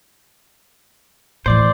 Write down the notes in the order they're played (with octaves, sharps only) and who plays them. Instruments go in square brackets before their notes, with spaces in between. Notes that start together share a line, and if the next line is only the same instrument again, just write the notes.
[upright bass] A2 E3 [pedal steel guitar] C5 D5